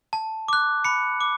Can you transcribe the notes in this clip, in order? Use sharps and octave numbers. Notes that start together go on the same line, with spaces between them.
A5
D6 F#6
B5 C#7
D6